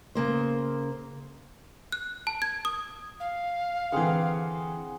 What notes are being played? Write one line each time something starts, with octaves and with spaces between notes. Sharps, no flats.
C#3 A#3 C5
F#6
A5
G#6
D#6
F5
D3 E3 C4 G#4 F#5